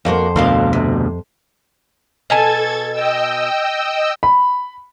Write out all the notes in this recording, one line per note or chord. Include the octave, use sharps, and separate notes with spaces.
F2 A#3 F#4 A#4 C5
D2 B2 A#4 F5 A5
C3
B2 A4 G#5 A5 G#6 A6
D#5 G5 E6
B5